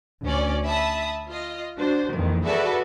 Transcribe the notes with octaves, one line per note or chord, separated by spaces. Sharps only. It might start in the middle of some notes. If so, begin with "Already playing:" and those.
D2 C#4 D5
E5 A5 B5 D#6
F4 D#5
D4 F#4 C5
A#1 F2 D#3 E3
F#4 G#4 A4 B4 D5 E5